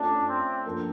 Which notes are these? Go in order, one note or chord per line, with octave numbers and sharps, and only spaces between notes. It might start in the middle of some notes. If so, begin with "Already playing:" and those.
Already playing: A3 C#4 D4 F4 A4
C4
F3 A#3 D4 F4 A4